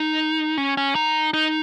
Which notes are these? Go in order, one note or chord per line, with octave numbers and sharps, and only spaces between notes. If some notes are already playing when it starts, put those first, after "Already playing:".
Already playing: D#4
C#4
C#4
D#4
D#4